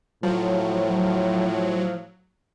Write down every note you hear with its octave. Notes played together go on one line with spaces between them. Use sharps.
A2 F3 F#3